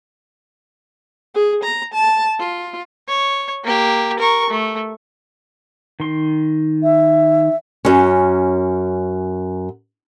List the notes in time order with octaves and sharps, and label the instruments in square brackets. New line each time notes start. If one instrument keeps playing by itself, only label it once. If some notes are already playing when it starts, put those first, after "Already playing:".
[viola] G#4
A#5
A5
F4
[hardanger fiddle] C#5
A#3 G4
A#4 C#6
A3
[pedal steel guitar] D#3 C6
[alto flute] E5
[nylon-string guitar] F#2 C#4